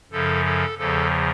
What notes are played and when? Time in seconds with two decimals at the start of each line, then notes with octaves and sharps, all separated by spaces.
0.12 F#2 C#3 F3 A4
0.45 A4
0.78 E2 C#3 F3 A4